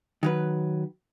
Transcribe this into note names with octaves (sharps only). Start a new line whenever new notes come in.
D#3 F#3 B4